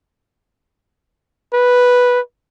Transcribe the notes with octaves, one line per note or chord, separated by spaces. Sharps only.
B4